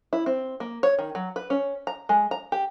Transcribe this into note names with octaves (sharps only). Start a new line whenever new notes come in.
E4
C4
A#3
C#5
D#3
F#3
B4
C#4
A#5
G#3
A#5
G4